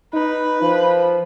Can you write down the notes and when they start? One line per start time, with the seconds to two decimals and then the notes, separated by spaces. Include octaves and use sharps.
0.14 D#4 B4
0.62 F3